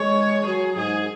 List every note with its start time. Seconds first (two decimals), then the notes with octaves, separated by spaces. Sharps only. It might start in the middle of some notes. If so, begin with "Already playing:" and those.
Already playing: G#3 C#5
0.46 F#3 G#4
0.77 G#2 G#4